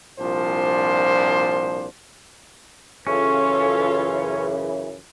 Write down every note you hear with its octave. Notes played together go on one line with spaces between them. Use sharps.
C2 A#2 F3 D4 C5
F#2 C#3 E3 C#4 F4 A4 C#5